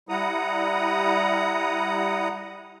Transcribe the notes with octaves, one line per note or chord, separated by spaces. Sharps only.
G3 E4 F#5 A#5 D#6